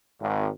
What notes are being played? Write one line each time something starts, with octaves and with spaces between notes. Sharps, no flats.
G#1